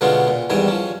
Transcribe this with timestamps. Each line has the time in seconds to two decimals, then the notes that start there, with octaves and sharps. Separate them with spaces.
0.01 B2 D3 G#3 B3 C#4 F4
0.28 A#2
0.50 E2 G#2 D#3 G3 G#5
0.68 F3 C#4